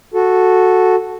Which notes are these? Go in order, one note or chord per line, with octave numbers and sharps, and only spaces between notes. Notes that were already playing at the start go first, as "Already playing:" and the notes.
F#4 A4